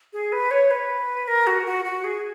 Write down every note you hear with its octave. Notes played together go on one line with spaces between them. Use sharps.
G#4
B4
C#5
B4
A#4
F#4
F#4
F#4
G#4